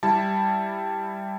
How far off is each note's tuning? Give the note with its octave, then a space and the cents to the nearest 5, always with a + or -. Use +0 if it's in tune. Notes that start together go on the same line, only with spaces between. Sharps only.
G3 +0 E4 +0 A5 +0